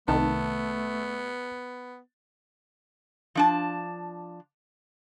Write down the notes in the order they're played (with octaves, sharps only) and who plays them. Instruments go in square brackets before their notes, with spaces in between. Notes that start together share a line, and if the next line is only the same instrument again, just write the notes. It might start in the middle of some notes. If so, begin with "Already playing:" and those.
[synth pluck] C2 D#3 [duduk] A3 [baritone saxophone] B3 [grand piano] A5
[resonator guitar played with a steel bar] F3 D4 A5